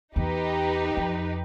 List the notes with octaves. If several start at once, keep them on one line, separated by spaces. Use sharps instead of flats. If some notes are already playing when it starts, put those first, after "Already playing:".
E2 D#4 G4 B4
F2